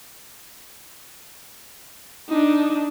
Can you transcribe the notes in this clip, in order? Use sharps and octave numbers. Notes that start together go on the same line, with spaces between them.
D4 D#4